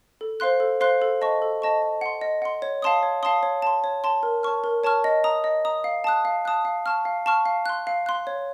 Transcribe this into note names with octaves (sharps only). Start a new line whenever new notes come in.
A4
C5 F5 C6 F#6
A4
C5 F5 C6 F#6
A4
D#5 A5 C#6
A4
D#5 A5 C#6
D#5
F#5 C6
D#5
F#5 C6
C#5
F5 A5 C6 D#6
C#5
F5 A5 C6 D#6
C#5
A5 C6
C#5
A5 C6
A#4
C#5 A5 C#6 F6
A#4
C#5 A5 C#6 F6
D#5
A#5 D#6
D#5
A#5 D#6
F5
A5 D#6 F#6
F5
A5 D#6 F#6
F5
A5 C#6 F6
F5
A5 C#6 F6
F5
C6 F#6
F5
C6 F#6
C#5